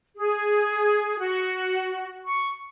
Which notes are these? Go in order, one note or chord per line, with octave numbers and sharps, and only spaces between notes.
G#4
F#4
C#6